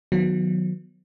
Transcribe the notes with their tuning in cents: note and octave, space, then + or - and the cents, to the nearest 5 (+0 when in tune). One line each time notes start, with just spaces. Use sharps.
D#3 -5 F#3 -20 B3 -10